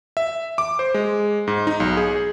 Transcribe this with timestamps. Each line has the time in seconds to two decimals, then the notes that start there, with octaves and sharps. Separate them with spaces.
0.17 E5
0.58 D6
0.79 C5
0.94 G#3
1.47 G#2
1.67 D#4
1.80 B1
1.97 G#4